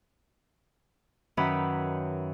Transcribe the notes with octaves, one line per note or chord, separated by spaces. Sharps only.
F#2 D#3 C#4 B4 E5 B5